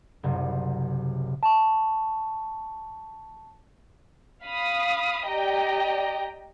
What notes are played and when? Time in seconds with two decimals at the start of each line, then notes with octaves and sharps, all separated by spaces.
0.23 F#1 C2 C3
1.43 A5 C#6
4.44 F5 B5 D#6
5.27 G4 D5 D#5 G5 A#5